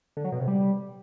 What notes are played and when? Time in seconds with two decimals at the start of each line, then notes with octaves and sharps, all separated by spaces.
0.17 D3
0.24 F#3
0.32 B2
0.40 C3
0.48 G3